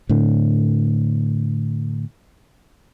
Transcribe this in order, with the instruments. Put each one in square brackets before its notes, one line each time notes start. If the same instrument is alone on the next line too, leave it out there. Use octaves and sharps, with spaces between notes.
[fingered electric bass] A2 D3